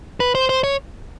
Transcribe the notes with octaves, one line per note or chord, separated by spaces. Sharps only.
B4
C5
C5
C#5